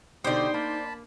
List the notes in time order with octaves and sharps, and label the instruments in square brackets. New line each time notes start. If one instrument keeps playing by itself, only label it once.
[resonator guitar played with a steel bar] B2 D3 [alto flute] D#4 [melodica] G4 D#6 [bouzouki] C5 D5
[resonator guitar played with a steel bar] A#3 [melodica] A5 B5